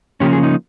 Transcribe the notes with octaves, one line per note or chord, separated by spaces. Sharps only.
C#3 F3 A#3 C#4 G4
G#4
D#4